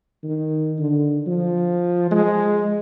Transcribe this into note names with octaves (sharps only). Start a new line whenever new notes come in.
D#3
D3
F3
G#3